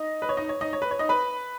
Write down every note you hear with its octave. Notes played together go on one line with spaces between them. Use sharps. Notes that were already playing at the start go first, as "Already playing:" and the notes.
Already playing: D#4 D#5
B4
C#5
D#4 D#5
C#5
D#4 D#5
C#5
B4
C#5
D#4 D#5
B4 B5